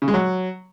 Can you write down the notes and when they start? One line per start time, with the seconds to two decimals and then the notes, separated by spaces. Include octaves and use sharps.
0.02 C#3
0.08 G#3
0.14 F#3